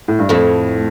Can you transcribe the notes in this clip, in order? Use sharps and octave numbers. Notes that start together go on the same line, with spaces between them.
A2
G2
F2 A2 A3